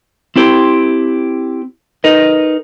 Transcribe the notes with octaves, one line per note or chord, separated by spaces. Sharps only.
C4 E4 G4 C5
D#4 A#4 B4 D#5